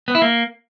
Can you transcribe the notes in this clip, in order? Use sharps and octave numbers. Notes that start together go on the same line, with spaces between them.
B3
E4
A#3